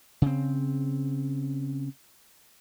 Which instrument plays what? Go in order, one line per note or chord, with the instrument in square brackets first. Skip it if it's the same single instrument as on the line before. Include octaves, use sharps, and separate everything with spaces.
[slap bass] C#3 C4